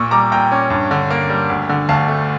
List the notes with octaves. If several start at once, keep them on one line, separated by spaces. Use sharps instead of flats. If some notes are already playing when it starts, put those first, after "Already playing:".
Already playing: A#2 A#3 C#6 E6
G3 A#5 D6
A#2 G5 A#5
C#4
G2
D3
A#3
G3
D2
D3
D2 F5 A5
A3